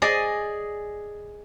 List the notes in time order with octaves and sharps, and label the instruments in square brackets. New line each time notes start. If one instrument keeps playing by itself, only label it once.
[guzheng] G#4 D5 D#5